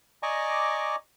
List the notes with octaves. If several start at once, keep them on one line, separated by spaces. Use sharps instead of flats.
D5 D#5 G#5 A#5 C#6 D6